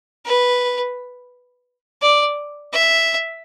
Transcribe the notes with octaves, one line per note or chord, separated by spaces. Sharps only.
B4
D5
E5